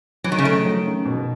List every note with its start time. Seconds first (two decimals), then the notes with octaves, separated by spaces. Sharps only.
0.24 E3 F#3
0.32 D#3
0.39 C#3
0.44 D#3 A3
0.65 F#3
0.86 C#3
1.06 B2